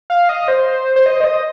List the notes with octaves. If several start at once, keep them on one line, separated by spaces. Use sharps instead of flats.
F5
D#5
C5
C5
D#5
C5
D#5